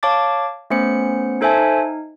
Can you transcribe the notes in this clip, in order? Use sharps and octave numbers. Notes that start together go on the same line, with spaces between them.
C#5 F5 A5 D6 A6
A3 B3 C#4 C5 C#7
D#4 A4 C5 E5 G#5 A5
D#4